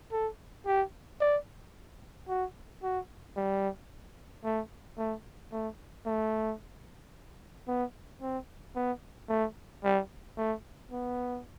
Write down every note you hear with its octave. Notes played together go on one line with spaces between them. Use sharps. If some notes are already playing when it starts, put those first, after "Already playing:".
A4
G4
D5
F#4
F#4
G3
A3
A3
A3
A3
B3
C4
B3
A3
G3
A3
B3